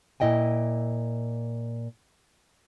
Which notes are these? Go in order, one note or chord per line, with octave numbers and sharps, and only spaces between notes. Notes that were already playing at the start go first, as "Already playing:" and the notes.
A#2 E4 D#5 G5 G#5